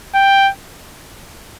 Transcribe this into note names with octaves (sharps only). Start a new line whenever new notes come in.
G5